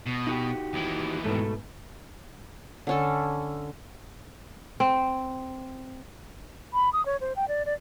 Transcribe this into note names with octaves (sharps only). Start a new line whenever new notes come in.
B2
D#4 F#4 G4
D#2 E3
G#2 B2 A3 A4
D3 C#4 A4
C4
B5
D#6
C#5
C5
G5
D5
D5